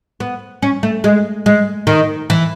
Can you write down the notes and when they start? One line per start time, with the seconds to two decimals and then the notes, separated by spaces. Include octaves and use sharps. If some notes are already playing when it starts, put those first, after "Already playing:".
0.20 B3
0.62 C#4
0.83 A3
1.04 G#3
1.46 G#3
1.87 D#3
2.30 E3